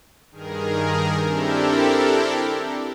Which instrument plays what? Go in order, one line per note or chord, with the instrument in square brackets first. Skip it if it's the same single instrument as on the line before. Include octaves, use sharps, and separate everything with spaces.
[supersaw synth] G2 D#3 G#4 A#4
C4 D4 E4 G4 A4 A#4